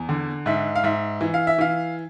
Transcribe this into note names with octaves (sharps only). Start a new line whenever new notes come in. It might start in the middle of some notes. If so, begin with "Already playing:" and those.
Already playing: E2
D3
G#2 E5
F5
G#2 E5
E3
F5
E5
E3 F5